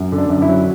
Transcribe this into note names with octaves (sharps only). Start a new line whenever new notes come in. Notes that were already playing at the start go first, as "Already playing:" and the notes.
Already playing: F#2
D3
D4
F#2
E4
F#3